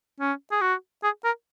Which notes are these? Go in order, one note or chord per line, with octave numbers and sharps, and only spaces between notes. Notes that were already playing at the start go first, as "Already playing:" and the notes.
C#4
G#4
F#4
G#4
A#4